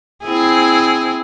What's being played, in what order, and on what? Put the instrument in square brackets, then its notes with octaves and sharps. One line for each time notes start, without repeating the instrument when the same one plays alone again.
[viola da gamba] C4 E4 G#4